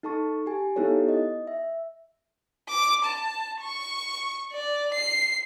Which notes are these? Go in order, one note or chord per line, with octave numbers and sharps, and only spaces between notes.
D#4 A4 A5 C#6
G4 G#5
B3 D#4 E4 G4 A4 C#5
D#5
E5
D6
A5
C#6
D5
C7